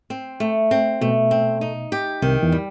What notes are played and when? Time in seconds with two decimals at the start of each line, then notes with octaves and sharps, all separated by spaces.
0.10 C4
0.40 A3
0.71 C4
1.01 B2 A3
1.31 C4
1.61 D#4
1.92 G4
2.22 C2 C3 D#3
2.43 E2 E3
2.52 G3